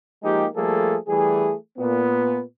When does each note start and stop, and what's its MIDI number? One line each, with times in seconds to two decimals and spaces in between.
0.23 0.46 53
0.23 0.46 56
0.23 0.46 58
0.23 0.46 63
0.23 0.46 67
0.55 0.96 53
0.55 0.96 55
0.55 0.96 57
0.55 0.96 58
0.55 0.96 68
0.55 0.96 69
1.08 1.53 52
1.08 1.53 55
1.08 1.53 57
1.08 1.53 68
1.78 2.40 46
1.78 2.40 59